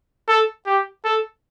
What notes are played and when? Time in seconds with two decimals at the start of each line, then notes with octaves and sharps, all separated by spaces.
0.28 A4
0.66 G4
1.04 A4